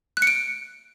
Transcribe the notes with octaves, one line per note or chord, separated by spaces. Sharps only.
F#6
C#7
D7